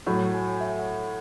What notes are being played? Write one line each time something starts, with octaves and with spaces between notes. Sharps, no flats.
A2 F#3 A3 F#5
F#5
G#5
F#5
E5
F#5